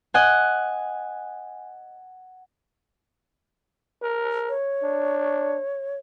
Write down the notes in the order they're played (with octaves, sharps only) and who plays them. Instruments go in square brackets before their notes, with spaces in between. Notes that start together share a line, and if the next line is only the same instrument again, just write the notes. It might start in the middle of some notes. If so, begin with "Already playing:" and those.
[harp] D#5 F#5 G#5
[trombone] A#4
[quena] C#5
[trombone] D4